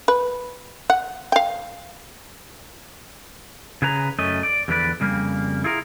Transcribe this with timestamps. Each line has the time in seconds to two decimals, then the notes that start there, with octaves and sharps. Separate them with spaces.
0.08 B4
0.90 F#5
1.32 F5 G5
3.82 C#3 G#4 B4 A#5
4.19 F#2 A3 C#4 D#5
4.43 D5
4.68 E2 D3 F3 B4 D5
5.00 F2 C#3 G3 A#3
5.64 E4 F4 G#4 A#4